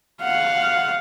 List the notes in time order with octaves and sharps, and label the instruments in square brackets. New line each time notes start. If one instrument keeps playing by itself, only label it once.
[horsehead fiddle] F5 F#5